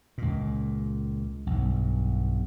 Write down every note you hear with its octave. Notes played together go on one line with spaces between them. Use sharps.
C#2 A#2
B1 G2